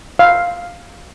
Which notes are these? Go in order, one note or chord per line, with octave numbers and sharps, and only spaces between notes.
F5